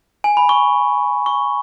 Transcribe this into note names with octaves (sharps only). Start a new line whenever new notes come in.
G#5
B5
C#6
C#6